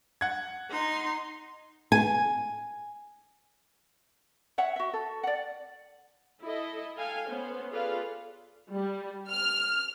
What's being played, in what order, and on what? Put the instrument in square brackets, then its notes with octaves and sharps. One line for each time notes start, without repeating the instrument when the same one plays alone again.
[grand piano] F#5 G#6
[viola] D#4 C6
[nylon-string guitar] G#5
[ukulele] C#5 E5 F#5
F#4 E5
A4
D5 F#5
[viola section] E4 A4 D#5
A4 F5 G5 G#5
B3 C#4 C5
F4 G#4 A4 B4 D5 F5
[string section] G3
F6